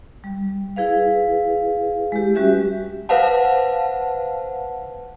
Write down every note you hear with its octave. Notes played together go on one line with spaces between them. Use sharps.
G3
E4 G#4 B4 F5
G#3 G4
G3 C#4 F#4 G4 B4 E5
B4 C5 F5 F#5 A5